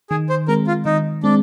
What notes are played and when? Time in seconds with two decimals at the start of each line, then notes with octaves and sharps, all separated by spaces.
0.10 D#3 G#4
0.29 C5
0.48 G#3 C4 A#4
0.67 F4
0.85 D#3 D#4
1.23 G#3 C4 D4